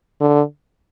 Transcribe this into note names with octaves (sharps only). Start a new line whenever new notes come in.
D3